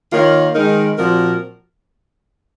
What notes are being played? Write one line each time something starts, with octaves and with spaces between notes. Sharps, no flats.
D#3 A#3 F4 A#4 C#5
D#3 G#3 D#4 A#4
A#2 F3 C4 F#4 A#4